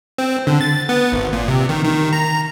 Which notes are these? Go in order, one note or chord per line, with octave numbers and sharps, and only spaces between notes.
C4
D3
A6
B3
G#1
A#2
C3
D#3
D#3
A#5